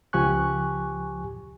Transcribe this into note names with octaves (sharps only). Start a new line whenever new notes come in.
C#2 F3 G4 G#5 C#6 F#6